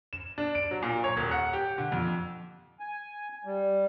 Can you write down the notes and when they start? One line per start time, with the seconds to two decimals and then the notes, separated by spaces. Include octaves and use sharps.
0.13 E7
0.38 D4
0.55 D7
0.71 F#3
0.82 A#2
1.04 C#5
1.17 D#1
1.31 F#5
1.53 G4
1.78 D3
1.92 F2
2.80 G#5
3.45 G3